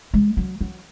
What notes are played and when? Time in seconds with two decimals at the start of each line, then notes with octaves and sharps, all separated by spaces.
0.14 G#3
0.37 F#3
0.61 F#3